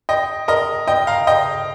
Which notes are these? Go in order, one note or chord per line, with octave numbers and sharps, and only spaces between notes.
D#5 G5
A#4 D#5
D#5 G5
F5 A#5
D#5 G5